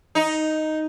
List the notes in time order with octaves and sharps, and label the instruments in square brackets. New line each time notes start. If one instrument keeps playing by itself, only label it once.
[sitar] D#4